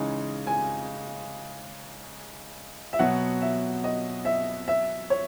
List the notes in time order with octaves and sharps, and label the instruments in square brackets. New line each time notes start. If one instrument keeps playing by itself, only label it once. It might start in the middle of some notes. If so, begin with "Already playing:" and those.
Already playing: [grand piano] C#3 E3 G#3 D#4
[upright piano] G#5
E5
[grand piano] B2 F#3 B3 [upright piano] F#5
[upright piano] E5
D#5
E5
E5
C#5